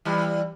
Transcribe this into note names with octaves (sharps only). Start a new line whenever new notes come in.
E3 G3